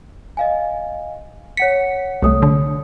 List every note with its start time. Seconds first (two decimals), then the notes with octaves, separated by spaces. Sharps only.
0.37 D#5 F5 G#5
1.57 C#5 F#5 B6 C#7
2.22 C2 A3 C#5 D#6
2.42 D3